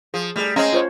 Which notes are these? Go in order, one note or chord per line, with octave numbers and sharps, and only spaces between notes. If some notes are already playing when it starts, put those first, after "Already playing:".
F3 G#4
G3 A3 G#4
G#3 C4 C#4 F5 A#5
F4 C5 C#5